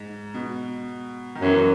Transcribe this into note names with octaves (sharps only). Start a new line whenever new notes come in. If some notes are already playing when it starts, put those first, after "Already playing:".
Already playing: G#2
B2
D#3
F#2 E3